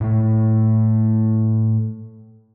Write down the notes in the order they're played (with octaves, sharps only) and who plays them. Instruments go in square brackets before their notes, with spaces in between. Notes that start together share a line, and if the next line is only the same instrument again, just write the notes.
[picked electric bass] A2 A3